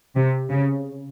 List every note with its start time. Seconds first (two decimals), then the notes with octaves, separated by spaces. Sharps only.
0.15 C3
0.50 C#3